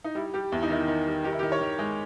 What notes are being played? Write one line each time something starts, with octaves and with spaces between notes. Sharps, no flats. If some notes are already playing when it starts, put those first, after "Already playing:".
D#4
G3 E4
G3 G4
E2 E4
D#4
D#3 E4
D#3
G3
D#3 G4
E4
G4
D#3
C#5
D#3
G#3